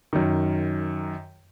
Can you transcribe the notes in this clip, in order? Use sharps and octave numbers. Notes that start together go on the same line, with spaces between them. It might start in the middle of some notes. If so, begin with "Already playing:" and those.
F#2 D#3